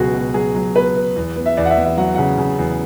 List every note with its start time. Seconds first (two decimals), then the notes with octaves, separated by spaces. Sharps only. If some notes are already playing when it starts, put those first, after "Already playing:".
Already playing: C#2 B2 F#3 F#4 G#4
0.14 B2
0.34 F#3 G#4
0.55 F#3
0.75 B3 B4
0.96 B3
1.16 E2
1.36 B3
1.46 E5
1.57 E2 D5
1.66 F#5
1.71 E5
1.77 E2
1.84 E5
1.97 F#3 F#5
2.15 C#3 F#5
2.38 C#3
2.58 E2